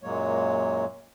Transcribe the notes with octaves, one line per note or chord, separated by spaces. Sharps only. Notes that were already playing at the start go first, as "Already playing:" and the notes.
F#2 A#2 F#3 G#3 A#3 C#5